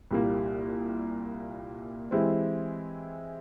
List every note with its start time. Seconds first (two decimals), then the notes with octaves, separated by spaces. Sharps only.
0.11 C2 A#2 G3 A#3
2.11 E3 G#3 C4 E4 G4